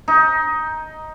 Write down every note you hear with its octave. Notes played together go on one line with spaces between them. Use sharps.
D#4